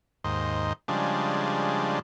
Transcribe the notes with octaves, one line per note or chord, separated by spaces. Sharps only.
D#2 G#2 C5 D#5
C#3 F3 G3 G#3 D4